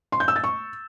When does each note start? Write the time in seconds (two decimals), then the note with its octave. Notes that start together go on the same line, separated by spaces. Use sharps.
0.12 C6
0.20 G6
0.28 E6
0.36 A6
0.44 C#6